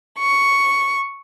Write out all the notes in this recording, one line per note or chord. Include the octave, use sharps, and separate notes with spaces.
C#6